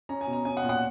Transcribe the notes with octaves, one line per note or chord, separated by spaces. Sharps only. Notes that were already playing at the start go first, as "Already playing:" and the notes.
C#4 A#5
G#5
B2
A#5
C#4 G#5
F#5
A#2
F#5